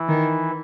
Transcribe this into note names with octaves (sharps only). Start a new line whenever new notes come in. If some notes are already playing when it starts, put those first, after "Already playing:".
Already playing: E3 E4
D#3